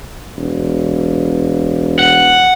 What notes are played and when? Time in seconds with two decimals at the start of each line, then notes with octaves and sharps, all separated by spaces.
0.36 E1
1.99 F#5